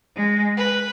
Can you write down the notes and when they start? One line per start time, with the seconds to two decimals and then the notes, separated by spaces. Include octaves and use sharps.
0.16 G#3
0.56 B4